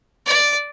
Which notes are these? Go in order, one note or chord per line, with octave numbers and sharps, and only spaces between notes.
D5